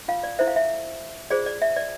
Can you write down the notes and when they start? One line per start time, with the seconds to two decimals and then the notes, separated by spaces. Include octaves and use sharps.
0.08 F4 F5
0.23 D5
0.39 E4 A4 C5 E5
0.47 F5
0.56 E5
1.30 F4 G#4 C5 D5
1.46 D5
1.62 E5
1.77 D5